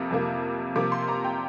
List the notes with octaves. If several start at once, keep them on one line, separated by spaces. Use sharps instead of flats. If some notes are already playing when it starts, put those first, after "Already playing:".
Already playing: F2 C3 A#3
F2 C3 A#3
C3 F3 A#3 D6
C6
A#5
G5